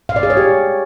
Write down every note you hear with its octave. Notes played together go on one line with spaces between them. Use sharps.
F5
D5
G#4
C#5
G4